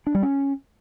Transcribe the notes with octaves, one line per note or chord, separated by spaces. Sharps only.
D4
G3
C#4